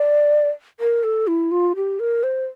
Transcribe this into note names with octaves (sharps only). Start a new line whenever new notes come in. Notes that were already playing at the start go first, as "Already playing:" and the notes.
Already playing: D5
A#4
A4
E4
F4
G4
A#4
C5